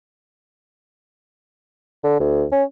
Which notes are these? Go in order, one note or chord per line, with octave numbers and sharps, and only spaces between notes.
D3
D2
C#4